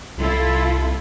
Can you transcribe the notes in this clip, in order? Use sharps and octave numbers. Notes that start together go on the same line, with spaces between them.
C2 E4 F4 A4